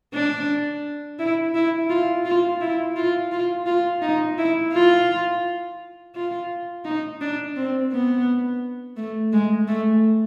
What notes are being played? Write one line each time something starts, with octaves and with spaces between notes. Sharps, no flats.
D4
E4
E4
F4
F4
E4
F4
F4
F4
D#4
E4
F4
F4
D#4
D4
C4
B3
A3
G#3
A3